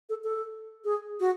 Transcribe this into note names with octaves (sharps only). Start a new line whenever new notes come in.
A4
A4
G#4
F#4